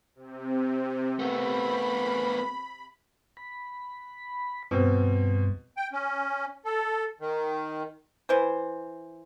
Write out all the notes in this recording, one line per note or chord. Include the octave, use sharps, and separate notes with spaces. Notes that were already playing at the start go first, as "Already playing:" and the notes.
C3
A3 B3 B5
B5
G2 B2 C4
G5
C#4
A4
D#3
E3 C5